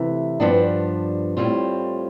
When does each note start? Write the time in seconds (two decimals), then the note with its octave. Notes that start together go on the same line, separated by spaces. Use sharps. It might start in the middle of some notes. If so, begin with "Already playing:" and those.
Already playing: C3 E3 A3
0.40 G2 F3 B3 D4
1.37 A2 G3 C4 F4